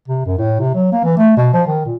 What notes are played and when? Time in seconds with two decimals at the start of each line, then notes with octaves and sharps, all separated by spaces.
0.08 C3
0.26 F#2
0.38 A2
0.60 C3
0.75 F#3
0.92 A#3
1.04 E3
1.17 A3
1.37 B2
1.54 F3
1.67 D#3
1.85 A#2